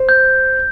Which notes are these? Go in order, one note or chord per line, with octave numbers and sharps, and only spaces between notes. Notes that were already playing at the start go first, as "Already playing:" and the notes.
Already playing: C5
G6